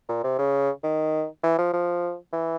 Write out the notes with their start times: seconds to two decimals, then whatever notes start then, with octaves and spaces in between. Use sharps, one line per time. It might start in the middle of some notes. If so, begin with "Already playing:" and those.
0.09 A#2
0.23 C3
0.39 C#3
0.83 D#3
1.43 E3
1.58 F3
1.73 F3
2.33 E3